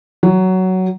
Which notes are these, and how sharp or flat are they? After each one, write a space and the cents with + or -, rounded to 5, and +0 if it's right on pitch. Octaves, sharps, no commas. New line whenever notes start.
F#3 +10